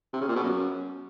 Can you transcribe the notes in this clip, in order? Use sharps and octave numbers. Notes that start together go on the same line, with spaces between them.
C3
C#3
A#2
B2
F#2